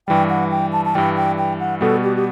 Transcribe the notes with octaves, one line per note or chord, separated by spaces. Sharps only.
G2 E3 G3 G5
F#5
G5
A5
A5
G2 E3 G3 G5
G5
G5
F#5
B2 G3 B3 F#4 A4
G4
G4